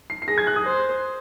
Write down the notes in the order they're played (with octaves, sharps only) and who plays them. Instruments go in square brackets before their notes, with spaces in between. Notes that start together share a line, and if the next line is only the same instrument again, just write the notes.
[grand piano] C7
C7
[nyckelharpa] G#4 [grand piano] A#6
[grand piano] G#6
F#6
D#6
[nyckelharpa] C5